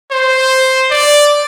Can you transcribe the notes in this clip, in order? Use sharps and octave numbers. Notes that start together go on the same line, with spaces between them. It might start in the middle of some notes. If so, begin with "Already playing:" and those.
C5
D5